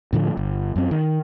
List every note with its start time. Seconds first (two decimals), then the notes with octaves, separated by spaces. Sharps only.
0.13 A2 D3 F3 A3
0.37 G1
0.76 F#2 C4
0.91 D#3